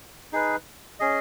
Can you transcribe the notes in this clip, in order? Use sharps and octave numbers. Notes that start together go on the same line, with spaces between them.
D#4 G#4 B4
C#4 G#4 D#5